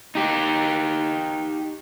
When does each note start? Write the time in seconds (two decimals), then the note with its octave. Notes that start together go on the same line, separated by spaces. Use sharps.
0.15 D#4 G4